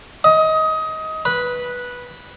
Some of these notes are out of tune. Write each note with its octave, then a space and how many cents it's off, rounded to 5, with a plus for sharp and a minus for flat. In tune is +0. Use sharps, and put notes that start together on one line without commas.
D#5 +20
B4 -10